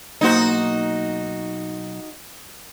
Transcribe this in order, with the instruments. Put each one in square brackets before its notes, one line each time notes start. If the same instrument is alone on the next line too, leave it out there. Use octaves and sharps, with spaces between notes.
[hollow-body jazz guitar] B1 A#3 C5 [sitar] D#4 F#4